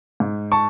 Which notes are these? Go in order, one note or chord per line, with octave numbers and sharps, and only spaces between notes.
G#2
A5 C#6